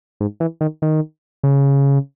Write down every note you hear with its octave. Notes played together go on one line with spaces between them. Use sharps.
G#2
E3
D#3
D#3
C#3